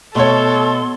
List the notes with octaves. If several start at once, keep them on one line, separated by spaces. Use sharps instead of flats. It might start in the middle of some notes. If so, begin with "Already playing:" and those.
B2 A3 A4 C#5 C6